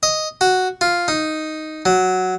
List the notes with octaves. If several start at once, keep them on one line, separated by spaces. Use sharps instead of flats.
D#5
F#4
F4
D#4
F#3